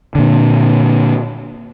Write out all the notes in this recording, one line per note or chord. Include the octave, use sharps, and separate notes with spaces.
A#2 D3